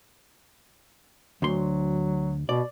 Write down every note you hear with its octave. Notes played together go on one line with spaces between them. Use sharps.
D2 F#3 C6
B2 D5